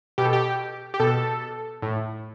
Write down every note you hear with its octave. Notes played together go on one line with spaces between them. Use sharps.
B2 G4
A4
G4
G4
B2 A4
A2